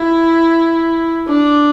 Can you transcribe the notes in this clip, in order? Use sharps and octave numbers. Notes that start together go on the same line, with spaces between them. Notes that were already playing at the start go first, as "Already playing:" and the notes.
Already playing: E4
D4